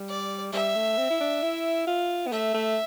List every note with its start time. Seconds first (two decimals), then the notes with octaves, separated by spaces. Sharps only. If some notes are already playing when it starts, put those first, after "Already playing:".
Already playing: G3
0.09 D5
0.53 G3 E5
0.76 A3
0.98 C4
1.10 E4
1.20 D4
1.42 E4
1.87 F4
2.27 B3
2.32 A3 E5
2.54 A3